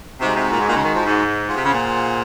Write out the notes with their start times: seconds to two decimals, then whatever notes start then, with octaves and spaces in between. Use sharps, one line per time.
0.20 C3 G#3 D#4 F#4
0.36 C3
0.52 A#2
0.60 G#2
0.68 A#2
0.76 C#3
0.85 D#3
0.95 F3
1.06 G#2
1.49 F4 G#4 C5 F#5
1.56 C3
1.65 C#3
1.73 A#2